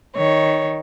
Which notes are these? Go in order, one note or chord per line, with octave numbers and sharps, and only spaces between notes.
D#3 C#5